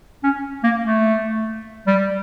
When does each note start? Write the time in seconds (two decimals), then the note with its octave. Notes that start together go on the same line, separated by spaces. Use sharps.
0.24 C#4
0.64 A#3
0.85 A3
1.87 G3